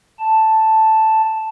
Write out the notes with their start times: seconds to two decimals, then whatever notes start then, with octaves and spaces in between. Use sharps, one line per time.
0.19 A5